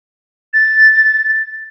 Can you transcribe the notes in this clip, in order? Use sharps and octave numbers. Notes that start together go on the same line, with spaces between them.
A6